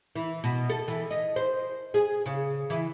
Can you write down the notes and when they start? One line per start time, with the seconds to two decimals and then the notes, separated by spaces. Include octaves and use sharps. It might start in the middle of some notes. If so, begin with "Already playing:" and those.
0.16 E3
0.44 B2
0.70 A4
0.88 E3
1.11 D#4
1.36 C5
1.94 G#4
2.26 C#3
2.70 E3